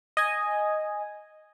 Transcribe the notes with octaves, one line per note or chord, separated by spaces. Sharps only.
D#5 G#5